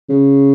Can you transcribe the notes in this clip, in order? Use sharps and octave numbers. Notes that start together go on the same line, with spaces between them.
C#3